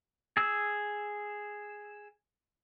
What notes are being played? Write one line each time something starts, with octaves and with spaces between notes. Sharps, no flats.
G#4 E6